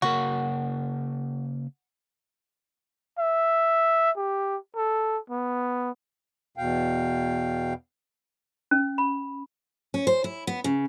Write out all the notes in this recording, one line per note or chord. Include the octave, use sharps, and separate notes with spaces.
C#3 A#3 F#4 A#4
E5
G4
A4
B3
E2 B2 F5 G5
C#4
B5
C#4
C5
E4
B3
C#3